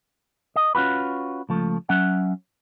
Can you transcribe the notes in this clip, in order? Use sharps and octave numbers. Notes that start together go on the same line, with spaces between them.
D#5
C#4 F4 F#4 B4
C#2 F3 A3
F#3 C#4 E5 F#5